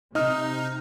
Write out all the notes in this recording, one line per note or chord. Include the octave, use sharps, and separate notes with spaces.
C3 D#4 D#5 D#6 F6